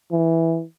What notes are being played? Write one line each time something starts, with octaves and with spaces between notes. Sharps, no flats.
E3